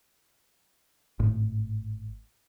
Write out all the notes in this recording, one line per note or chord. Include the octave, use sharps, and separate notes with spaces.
G#1 A2